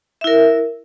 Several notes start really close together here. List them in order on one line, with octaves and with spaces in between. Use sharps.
E5 E4 A#4